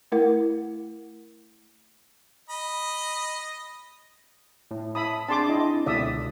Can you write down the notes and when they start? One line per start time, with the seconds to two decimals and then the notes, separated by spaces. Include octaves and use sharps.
0.12 A3 E4 A#4 F#5
2.50 D#5 B5
4.71 A2
4.95 E5 A5 B5 D#6
5.29 C4 D4 G#4 A5 C6 D6
5.49 E4 D#5
5.86 C#2 B2 D3 D5 E5 D#6